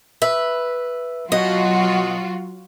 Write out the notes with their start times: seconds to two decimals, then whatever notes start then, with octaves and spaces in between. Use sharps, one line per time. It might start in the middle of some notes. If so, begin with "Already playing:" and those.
0.22 B4 E5
1.32 B2 F#3 F4 F#4 D#5